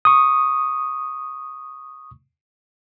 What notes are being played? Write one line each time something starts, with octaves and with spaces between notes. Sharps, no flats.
C#6 D#6